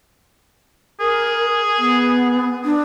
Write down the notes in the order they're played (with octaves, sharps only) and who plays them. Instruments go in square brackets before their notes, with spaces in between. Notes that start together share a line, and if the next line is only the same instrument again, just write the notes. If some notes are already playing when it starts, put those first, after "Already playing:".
[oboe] G#4 [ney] A#4
[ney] B3
D4